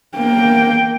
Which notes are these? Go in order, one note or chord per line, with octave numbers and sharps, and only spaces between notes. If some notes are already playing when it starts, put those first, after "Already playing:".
A#3 G5